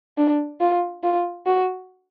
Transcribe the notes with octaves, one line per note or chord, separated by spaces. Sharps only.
D4
F4
F4
F#4